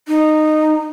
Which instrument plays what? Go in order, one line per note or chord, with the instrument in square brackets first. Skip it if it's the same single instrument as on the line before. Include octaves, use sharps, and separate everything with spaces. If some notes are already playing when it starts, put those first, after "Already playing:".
[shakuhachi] D#4